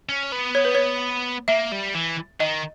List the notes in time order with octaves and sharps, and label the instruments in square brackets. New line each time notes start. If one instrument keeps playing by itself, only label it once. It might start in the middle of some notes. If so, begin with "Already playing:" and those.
[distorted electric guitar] C#4
B3
[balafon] C#5
B4
C#5
[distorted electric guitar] A#3 [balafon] E5
[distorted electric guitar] G3
E3
[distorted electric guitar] D#3 [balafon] D#5